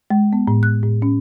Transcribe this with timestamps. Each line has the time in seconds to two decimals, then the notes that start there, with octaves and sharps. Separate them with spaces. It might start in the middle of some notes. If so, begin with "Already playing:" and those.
0.10 G#3
0.33 B3
0.48 A2
0.63 F#6
0.83 A2
1.02 C#4